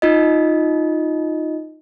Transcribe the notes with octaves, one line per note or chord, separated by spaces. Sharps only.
D#4 F4 D#5